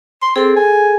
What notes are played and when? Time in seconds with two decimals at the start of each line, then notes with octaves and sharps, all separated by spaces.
0.22 C6
0.36 C4 G#4 A4
0.56 G#5